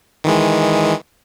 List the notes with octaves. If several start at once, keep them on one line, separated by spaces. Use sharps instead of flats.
D#3 E3 G#3